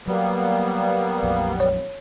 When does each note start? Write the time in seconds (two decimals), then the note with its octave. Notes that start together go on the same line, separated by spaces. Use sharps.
0.07 F#3 G3 A#3 B3
1.23 A#1 F2 F#3
1.60 C#5